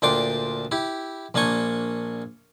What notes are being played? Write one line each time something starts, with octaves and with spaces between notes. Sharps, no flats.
D2 A#2 D4 G5 C6 D6
E4 G4
A#1 A#3 D4 G#5 C#6